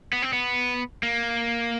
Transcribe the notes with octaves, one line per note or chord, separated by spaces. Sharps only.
B3
C4
B3
A#3